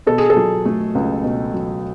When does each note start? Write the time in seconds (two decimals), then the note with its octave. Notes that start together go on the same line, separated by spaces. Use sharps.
0.07 B2 A4
0.18 G#4
0.30 A4
0.37 F#3
0.66 A3
0.95 C#2
1.24 B2
1.54 F#3